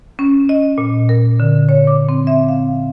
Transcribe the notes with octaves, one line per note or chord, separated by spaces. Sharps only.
C#4
D#5
A#2
A#4
D3
C#5
D6
C4
E5
F5